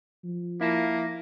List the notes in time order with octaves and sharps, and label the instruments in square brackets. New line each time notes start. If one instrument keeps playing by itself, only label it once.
[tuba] F3
[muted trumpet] A#3 [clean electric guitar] E4 A5